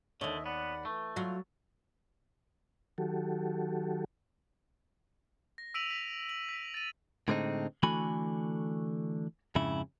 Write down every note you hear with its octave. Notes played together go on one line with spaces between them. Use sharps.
D#2 D3 C#5 D#5 E5
B3 D5 F#5 B5
E3 A3
F#3 F4 F5
D#3 F#3 F#4 G4 A4
A#6
E6 B6 D7 D#7 F7 F#7
B6
F#7
B6
A6 D#7
A2 D3 G#3 A3 C4 D#4
D3 E3 A3 F#4 G#5 B5
F2 G#2 C#3 E4